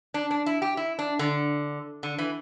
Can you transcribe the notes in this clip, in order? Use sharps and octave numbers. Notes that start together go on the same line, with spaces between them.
D4
D4
E4
G4
E4
D4
D3
D3
E3